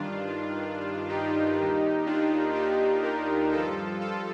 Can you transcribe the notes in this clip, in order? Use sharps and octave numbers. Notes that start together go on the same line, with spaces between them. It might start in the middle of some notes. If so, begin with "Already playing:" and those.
Already playing: G2 D#3 D4 F4
D#4 G4
D#2 D#3
D4 F4
D#4 G4
G4 A#4
G2 F3 F4 A4
F4 A4